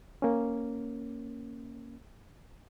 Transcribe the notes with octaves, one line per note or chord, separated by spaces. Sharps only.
A#3 C#4